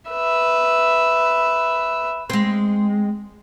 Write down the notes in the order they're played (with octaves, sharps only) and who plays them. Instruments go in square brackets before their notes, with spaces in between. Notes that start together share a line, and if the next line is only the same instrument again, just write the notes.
[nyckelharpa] B4 E5
[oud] G#3 C4